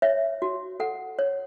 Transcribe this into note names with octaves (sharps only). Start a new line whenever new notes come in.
C#5 E5
F#4
A4 F#5
C#5